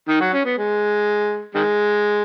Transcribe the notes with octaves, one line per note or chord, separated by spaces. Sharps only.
D#3 D#4
F#3 F#4
C#4
B3
G#3
D#3 G#3